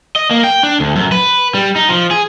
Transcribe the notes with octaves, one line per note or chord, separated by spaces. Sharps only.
D#5
A#3
G5
D4
D2
F#2
B4
G3
D#4
F3
G#4